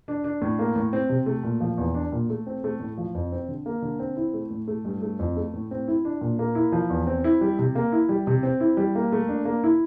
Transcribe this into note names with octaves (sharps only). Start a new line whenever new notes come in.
D4
D4
A2
A#3
A2
C4
C3
A3
A#2
F3
E2
D4
A#2
A3
C4
A3
A2
F3
F2
C4
D3
A#3
D3
C4
E4
A3
A2
A3
G2
A3
F2
A3
A2
C4
E4
D4
A#2
A#3
E4
F3
E2
C4
E4
G3
C3
A#3
E4
G3
C3
C4
E4
G3
A#3
A3
D4
A#3
E4